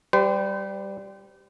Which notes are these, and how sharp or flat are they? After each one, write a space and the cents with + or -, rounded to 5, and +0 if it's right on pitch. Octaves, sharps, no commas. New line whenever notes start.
G3 +0 C5 -35